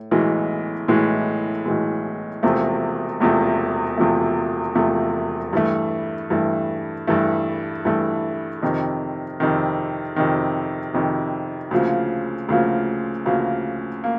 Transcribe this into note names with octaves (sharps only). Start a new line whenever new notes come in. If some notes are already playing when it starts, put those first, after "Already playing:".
Already playing: A2
B1 A2 E3 G#3
B1 A2 E3 G#3
B1 A2 E3 G#3
E1 E2 C3 F3 A3
E1 E2 C3 F3 A3
E1 E2 C3 F3 A3
E1 E2 C3 F3 A3
G2 E3 A3
G2 E3 A3
G2 E3 A3
G2 E3 A3
F2 C3 D#3
F2 C3 D#3
F2 C3 D#3
F2 C3 D#3
D2 C#3 F3 A#3
D2 C#3 F3 A#3
D2 C#3 F3 A#3
A#3